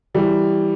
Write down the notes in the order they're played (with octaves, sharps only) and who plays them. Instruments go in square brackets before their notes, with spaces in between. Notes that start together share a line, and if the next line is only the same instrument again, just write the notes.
[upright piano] E3 G3